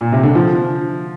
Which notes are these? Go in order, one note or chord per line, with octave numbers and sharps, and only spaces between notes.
A#2
C3
D3
F3